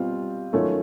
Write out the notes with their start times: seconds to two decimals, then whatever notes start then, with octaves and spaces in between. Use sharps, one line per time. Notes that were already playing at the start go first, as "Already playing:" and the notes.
Already playing: B2 G3 C4 F4
0.53 D#3 F#3 A3 C#4 F4